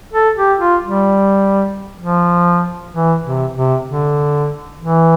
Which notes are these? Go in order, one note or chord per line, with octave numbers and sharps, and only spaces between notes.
A4
G4
F4
G3
F3
E3
C3
C3
D3
E3